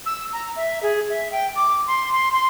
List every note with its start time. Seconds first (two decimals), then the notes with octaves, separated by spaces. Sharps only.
0.06 E6
0.33 A#5
0.56 E5
0.83 G#4
1.10 E5
1.32 G5
1.56 D6
1.87 C6
2.13 C6
2.33 C6